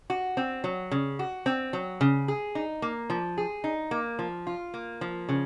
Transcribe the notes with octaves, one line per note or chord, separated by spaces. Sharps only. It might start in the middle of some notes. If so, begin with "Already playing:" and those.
F#4
C4
F#3
C#3
F#4
C4
F#3
C#3
G#4
D#4
A#3
F3
G#4
D#4
A#3
F3
F4
A#3
F3
C#3